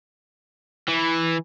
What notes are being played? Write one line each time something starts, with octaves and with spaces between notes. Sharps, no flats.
E3